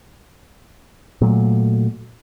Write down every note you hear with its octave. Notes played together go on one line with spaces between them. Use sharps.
A#2 F#3 A3